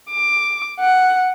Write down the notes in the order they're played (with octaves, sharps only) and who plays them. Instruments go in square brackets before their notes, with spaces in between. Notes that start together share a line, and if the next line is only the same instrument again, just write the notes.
[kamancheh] D6
F#5